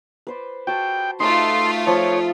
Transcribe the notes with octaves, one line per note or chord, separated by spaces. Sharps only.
B4 C5 D5
F#4 G5 A5
A3 D#4 F4 C6
F3 C#5